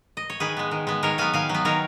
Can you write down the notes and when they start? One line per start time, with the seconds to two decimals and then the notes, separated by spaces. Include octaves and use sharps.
0.17 D#5
0.30 C#5
0.40 D#3 G#4 B4
0.57 G#3 B3
0.71 D#3
0.87 G#3 B3
1.03 D#3 A#4 C#5
1.18 F#3 B3 F5 G#5
1.33 D#3 F5 G#5
1.49 F#3
1.54 B3
1.65 D#3 A#4 C#5